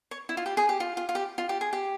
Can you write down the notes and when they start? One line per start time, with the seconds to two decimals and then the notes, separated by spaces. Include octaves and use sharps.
0.11 C#5
0.29 E4
0.37 F4
0.46 G4
0.57 G#4
0.69 G4
0.80 F4
0.97 F4
1.09 F4
1.15 G4
1.38 F4
1.49 G4
1.61 G#4
1.73 G4